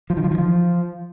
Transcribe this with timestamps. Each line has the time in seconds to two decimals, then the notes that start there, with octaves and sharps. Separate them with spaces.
0.10 F3
0.17 D#3
0.24 F3
0.31 D#3
0.38 F3